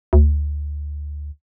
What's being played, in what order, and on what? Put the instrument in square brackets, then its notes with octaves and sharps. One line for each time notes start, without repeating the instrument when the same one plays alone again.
[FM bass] D2